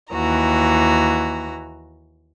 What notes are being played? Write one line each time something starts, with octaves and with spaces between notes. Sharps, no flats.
D#2 E3 F#4 A#5